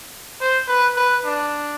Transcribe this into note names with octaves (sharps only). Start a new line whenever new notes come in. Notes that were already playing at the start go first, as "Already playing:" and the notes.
C5
B4
B4
D4